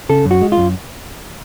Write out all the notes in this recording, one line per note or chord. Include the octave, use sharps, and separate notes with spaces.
C#3 A4
F#2
F#4
G#3
F4
F#2